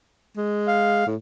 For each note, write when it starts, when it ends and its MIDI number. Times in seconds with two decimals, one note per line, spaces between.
0.37 1.03 56
0.68 1.06 77
1.07 1.16 45